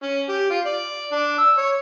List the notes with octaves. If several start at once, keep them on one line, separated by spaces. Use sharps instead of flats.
C#4
G4
F4
D5
D4
E6
C#5